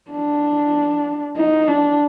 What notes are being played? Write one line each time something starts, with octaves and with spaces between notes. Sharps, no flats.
D4
D#4
D4